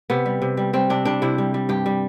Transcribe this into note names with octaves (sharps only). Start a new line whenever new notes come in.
C3 B3
G3
C3
G3
G3 C4
C3 D4
G3 D4
C3 E4
G3
G3
G2 G4
G3